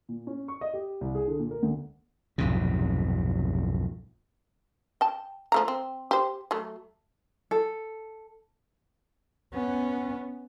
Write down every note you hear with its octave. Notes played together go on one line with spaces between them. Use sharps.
A#2
C#4
C#6
D#5
G4
C2
G#4
D3
A#2
A#4
D2
B1 F2 G#2 C3
G5 A5
F3 A3 A#5
C4
G4 C5
F#3 A3
A4
B3 C#4